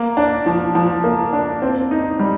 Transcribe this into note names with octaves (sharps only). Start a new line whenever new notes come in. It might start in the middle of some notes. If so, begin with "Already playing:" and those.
Already playing: A#3
D4
F3
F3
A#3
D4
C4
D#4
G3